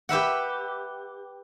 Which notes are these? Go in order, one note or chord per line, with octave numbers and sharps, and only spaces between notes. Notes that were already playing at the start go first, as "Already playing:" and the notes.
G4 B4 E5 F#5